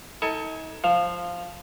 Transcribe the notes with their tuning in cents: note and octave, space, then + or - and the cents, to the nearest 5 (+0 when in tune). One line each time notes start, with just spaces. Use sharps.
D#4 +40 A4 +25 G#5 +0
F3 +0 F5 +0